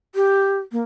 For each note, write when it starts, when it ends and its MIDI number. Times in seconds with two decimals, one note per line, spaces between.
0.15 0.58 67
0.72 0.82 58